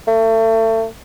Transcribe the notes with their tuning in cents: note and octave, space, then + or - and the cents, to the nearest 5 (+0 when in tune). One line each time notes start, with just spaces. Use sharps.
A3 +30